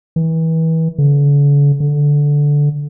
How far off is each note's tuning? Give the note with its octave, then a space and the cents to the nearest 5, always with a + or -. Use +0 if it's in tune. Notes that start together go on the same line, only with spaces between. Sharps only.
E3 -30
D3 -45
D3 -10